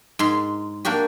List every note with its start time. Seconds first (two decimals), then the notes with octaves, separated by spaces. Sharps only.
0.19 G#2 C6
0.85 A#3 D4 F#4 G4